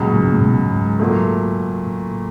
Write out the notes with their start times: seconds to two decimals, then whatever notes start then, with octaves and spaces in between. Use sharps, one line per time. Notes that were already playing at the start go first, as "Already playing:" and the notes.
Already playing: C#2 A#2 C#3 F#3
0.13 A2
0.23 G#2
0.33 A2
0.41 B2
0.71 G#2
0.99 A#2 F#3 A3
1.87 A2